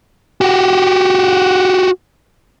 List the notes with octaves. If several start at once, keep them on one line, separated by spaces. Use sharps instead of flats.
F#4 G4